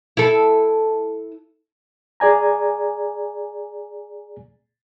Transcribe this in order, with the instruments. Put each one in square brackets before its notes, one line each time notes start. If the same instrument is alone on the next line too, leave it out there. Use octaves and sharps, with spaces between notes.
[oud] E4 A4
[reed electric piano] G#4 D5 G#5 A#5